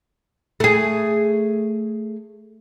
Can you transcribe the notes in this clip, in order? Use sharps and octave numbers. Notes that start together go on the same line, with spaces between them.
A3 G#4